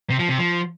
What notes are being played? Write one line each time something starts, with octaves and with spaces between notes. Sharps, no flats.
C3
F3
C3
F3